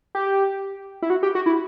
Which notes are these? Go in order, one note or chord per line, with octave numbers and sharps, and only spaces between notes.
G4
E4
F#4
G4
F#4
E4